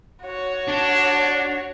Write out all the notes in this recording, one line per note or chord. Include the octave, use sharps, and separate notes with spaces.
F#4 C#5
D4